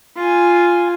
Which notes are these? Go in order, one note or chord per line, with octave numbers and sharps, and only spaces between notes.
F4 G#5